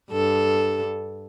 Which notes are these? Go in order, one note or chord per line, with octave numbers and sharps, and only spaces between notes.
G2 A4